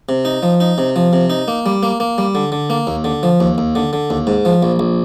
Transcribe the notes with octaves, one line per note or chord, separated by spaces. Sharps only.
C3
D#4
F3
D#4
C3
F3
C3
D#4
A#3
G3
A#3
A#3
G3
D3
D3
A#3
D#2
D3
F3
D#2
D#2
D3
D3
D#2
G#2
F3
A#1
A#1